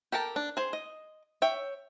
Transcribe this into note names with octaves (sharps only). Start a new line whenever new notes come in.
G4 A4 A#4 A5
D4
G#4 C5
D#5
C#5 E5 G5